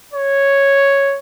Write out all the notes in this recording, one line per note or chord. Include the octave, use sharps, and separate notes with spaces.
C#5